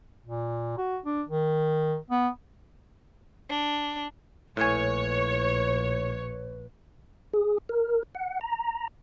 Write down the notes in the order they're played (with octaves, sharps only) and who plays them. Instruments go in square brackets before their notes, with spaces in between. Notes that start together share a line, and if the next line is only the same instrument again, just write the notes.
[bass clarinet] A#2
F#4
D4
D#3
B3
[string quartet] D4
[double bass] A#1 [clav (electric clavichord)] A2 G#5 [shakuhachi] B4 [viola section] C#5
[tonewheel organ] G#4
A#4
F#5
A#5